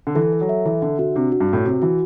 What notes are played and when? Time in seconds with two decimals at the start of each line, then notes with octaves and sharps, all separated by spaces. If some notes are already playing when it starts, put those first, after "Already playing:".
0.07 D3
0.15 E3 A4
0.33 A4
0.41 F#3
0.49 E5
0.65 E3 A4
0.82 D3 E5
0.99 D3 F#4
1.16 C3 D4
1.32 F#4
1.40 G2
1.49 A2 F#4
1.66 C3 F#4
1.82 E3 F#4